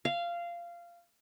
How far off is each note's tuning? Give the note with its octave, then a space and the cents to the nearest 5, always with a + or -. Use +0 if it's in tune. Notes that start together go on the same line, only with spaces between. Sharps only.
F5 -15